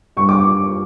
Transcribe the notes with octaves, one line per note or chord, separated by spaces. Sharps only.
G2 C#6
D6